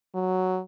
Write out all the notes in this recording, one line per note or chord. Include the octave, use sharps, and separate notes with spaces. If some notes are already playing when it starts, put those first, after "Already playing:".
F#3